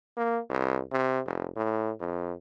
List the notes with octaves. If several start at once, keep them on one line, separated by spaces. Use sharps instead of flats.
A#3
C2
C3
F1
A2
F2